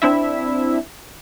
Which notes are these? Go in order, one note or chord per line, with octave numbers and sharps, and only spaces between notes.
C4 D4 E4 E5